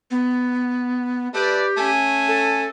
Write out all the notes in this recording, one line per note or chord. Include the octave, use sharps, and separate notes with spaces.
B3
A3 G4 B4 D5
A3 C#4 G#5
A4